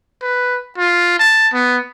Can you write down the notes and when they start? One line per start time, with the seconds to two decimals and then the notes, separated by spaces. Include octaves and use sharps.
0.22 B4
0.78 F4
1.19 A5
1.54 B3